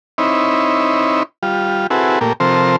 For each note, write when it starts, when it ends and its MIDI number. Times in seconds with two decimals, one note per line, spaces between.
0.18 1.23 60
0.18 1.23 63
0.18 1.23 64
0.18 1.23 73
0.18 1.23 83
1.43 1.87 55
1.43 1.87 65
1.90 2.19 60
1.90 2.19 64
1.90 2.19 66
1.90 2.19 68
1.90 2.19 69
1.90 2.19 71
2.21 2.33 46
2.21 2.33 57
2.21 2.33 58
2.21 2.33 67
2.40 2.76 48
2.40 2.76 53
2.40 2.76 60
2.40 2.76 69
2.40 2.76 70
2.40 2.76 72